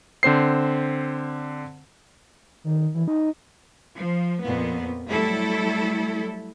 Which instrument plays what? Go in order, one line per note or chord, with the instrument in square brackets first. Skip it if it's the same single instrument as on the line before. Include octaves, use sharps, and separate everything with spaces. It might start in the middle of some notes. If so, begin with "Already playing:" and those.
[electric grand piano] D3 C4 C5 C7
[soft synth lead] D#3
E3
D#4
[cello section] F3
F2 A#2 B3
F#3 G3 A3 E4 A4